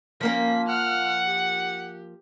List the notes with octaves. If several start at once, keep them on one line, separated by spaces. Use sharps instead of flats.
F3 A#3 C#4 A#4 B6
F#5 F6 F#6
G4